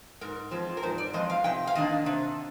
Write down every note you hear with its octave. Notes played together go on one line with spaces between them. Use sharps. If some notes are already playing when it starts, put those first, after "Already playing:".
G#2 A#4
F3 G#3 C4
A#4
G#2 C5
D5
F3 G#3 C4 D#5
F5
C3 G5
F5
D#3 A#3 D4 D#5
C3